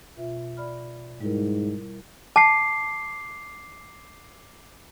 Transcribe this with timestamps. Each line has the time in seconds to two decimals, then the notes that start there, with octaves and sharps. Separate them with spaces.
0.17 B2 F4 E5
0.57 D5 B5 F6
1.21 G#2 G3 E4 A#4
2.36 A5 D6 C7